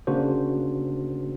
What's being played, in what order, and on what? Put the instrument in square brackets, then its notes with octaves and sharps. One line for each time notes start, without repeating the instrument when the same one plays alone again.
[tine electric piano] C#3 A#3 D4 F#4 C5